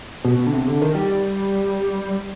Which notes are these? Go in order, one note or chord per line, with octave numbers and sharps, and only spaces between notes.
B2
D3
C3
D3
D#3
G3